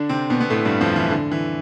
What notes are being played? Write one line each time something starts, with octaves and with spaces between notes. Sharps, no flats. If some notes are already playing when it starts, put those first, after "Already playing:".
Already playing: D3 D4
C3 C4
B2 B3
B3
A2 A3
G2 G3
F2 F3
E3
D3
E3